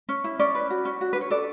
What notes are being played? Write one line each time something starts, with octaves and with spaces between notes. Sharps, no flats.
C#4
E4
C#4 D5
B4
F#4
C#4
F#4
D4 B4
C#5
A4 D5